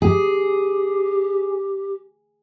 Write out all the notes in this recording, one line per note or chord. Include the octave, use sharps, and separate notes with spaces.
G4 G#4